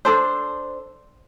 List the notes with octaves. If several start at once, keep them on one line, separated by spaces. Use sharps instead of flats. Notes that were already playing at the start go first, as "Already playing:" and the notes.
D4 A4 C5